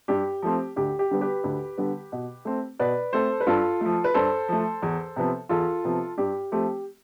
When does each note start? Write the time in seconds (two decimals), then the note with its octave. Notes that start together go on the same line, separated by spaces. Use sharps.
0.08 G2 G4
0.42 F3 A3 C4
0.76 D2 G4
0.99 G4
1.11 D3 G3 B3
1.21 G4 B4
1.44 D2
1.78 D3 G3 B3
2.12 B2
2.45 A3 C4
2.79 B2 B4 D5
3.13 A3 C4 A4 C5
3.40 B4
3.47 G2 F4 A4
3.81 F3 A3
4.04 B4
4.14 G2 A4 C5
4.48 F3 A3
4.82 E2
5.16 C3 F3 B3
5.49 E2 F4 A4
5.84 C3 F3 B3
6.18 G2 G4
6.52 F3 A3 C4 G4